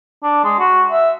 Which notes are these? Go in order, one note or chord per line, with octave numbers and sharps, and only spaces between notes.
D4
G#3
F#4
E5